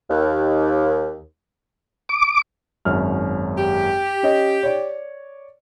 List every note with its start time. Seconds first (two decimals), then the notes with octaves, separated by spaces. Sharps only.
0.09 D#2
2.09 D6
2.85 G#1 F#2 F6
3.57 G4
4.23 C#4 C#5 D#5
4.63 C#5 D5